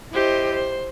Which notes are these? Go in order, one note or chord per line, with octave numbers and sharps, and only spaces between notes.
E4 G4 C5 D#5
C5